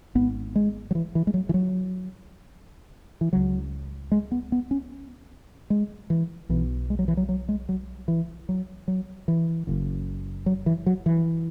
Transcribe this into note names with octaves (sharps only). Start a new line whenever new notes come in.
G#1 G#2 B3
G#3
F#3
E3
E3
G#3
F#3
E3
F#3
E3
C#2 C#3 F#3
G#3
B3
B3
C#4
G#3
E3
B1 B2 E3
G#3
F#3
E3
F#3
F#3
G#3
F#3
E3
F#3
F#3
E3
F#1 F#2 C#3
F#3
E3
F#3
E3